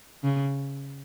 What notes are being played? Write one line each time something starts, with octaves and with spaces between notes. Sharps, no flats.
C#3